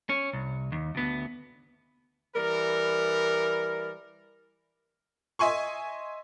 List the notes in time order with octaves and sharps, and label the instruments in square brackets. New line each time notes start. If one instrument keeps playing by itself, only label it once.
[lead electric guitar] C#4
C2
D#2
D2 B3
[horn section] E3 G3 A#4
[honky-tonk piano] D#5 E5 G#5 C6 C#6